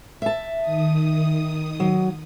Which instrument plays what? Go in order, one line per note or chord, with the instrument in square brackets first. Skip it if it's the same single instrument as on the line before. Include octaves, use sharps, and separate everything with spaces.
[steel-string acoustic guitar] E5 A5
[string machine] D#3 D#6
[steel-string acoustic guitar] F#3